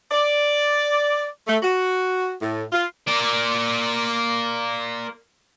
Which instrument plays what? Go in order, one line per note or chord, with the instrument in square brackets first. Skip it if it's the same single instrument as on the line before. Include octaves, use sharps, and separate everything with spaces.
[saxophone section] D5
A3
F#4
A2
F4
[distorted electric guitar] A#3 D5